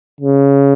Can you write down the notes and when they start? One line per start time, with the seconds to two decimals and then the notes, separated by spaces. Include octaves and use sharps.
0.20 C#3